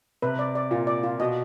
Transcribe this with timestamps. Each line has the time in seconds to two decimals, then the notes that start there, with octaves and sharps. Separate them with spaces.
0.22 C3 B4
0.39 D5
0.55 D5
0.71 A#2 F4
0.87 D5
1.03 F4
1.20 B2 D#5